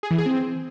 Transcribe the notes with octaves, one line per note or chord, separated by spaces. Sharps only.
G#4
E3
G#4
C4